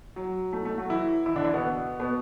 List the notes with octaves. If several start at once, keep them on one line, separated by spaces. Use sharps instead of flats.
F#3
A3
A3
F#3 F#4
E3 E4
E3 E4
D3 D4
E3 E4
B2 B3
B2 B3